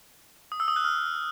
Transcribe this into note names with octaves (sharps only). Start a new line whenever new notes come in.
D#6
E6
D#6
F#6
F6